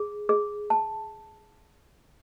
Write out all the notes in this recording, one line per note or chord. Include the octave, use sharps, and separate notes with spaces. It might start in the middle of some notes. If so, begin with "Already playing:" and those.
Already playing: G#4
G#4
A5